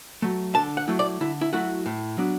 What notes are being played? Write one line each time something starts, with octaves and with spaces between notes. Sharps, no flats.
F#3 A3
D3 A5
F#5
F#3 A3 E4
D5
D3 E4
E4
F#3 A3 E4 F#4
A2
F#3 B3 D4